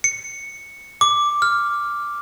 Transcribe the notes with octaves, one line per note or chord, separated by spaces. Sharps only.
C#7
D6
F6